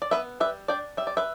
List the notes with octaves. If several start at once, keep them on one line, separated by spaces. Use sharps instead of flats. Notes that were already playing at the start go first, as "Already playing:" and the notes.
D5
B3 B4 E5
G3 B4 E5
D4 D5 G5
G3 E5
D5
B4 E5